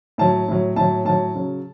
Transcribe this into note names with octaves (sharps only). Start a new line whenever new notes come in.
A2 F#3 A5
A2 F#3
A2 F#3 A5
A2 F#3 A5
C#3 F#3